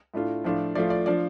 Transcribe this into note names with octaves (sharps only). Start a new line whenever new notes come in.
A2 A3 D4 F4
A2 F3 A3 D4 F4
F3 A3 F4 D5
D5
F3 D4 F4 D5